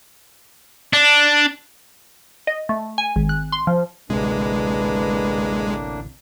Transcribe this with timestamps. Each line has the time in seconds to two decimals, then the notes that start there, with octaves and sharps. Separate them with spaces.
0.93 D4
2.47 D#5
2.69 A3
2.98 G#5
3.16 G#1
3.29 F#6
3.52 C6
3.67 F3
4.10 A1 D2 A2 C3 G#3 A#3 D4 B4